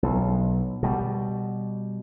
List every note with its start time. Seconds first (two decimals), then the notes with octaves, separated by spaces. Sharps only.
0.03 B1
0.83 B2 G3